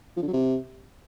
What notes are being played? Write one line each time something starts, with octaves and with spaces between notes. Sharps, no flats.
F3
D3
F#3
C3